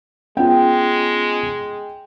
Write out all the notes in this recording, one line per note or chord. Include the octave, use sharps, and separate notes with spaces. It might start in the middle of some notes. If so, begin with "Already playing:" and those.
G#3 B3 C#4 F4 G5